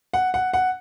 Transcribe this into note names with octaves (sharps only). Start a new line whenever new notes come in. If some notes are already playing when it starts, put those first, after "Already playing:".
F#5
F#5
F#5